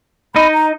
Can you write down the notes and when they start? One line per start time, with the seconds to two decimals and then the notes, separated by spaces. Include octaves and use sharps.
0.35 D#4 D#5 B5
0.54 A#5